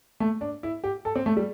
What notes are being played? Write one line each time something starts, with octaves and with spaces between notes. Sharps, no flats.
A3
D4
E4
G4
A4
C4
A3
G3